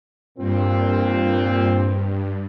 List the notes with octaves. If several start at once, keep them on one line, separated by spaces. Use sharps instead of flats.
G2 A#2 C4